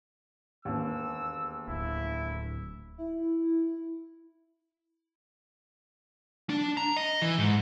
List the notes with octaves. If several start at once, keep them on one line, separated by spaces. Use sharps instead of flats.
E1 D#2 E6
D1 E4
E4
D4
A#5
D#5
E3
G#2